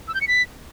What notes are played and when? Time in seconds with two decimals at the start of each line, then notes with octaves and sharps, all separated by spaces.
0.08 E6
0.15 G6
0.21 C#7
0.28 B6